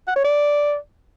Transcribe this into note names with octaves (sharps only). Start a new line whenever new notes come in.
F#5
C#5
D5